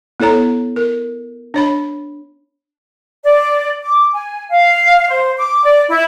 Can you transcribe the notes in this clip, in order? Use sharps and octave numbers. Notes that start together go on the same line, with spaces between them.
B3 E4 A4 C#5 A#5
A#4
D4 C#5 B5
D5
D6
G#5
F5
C5
D6
D5
E4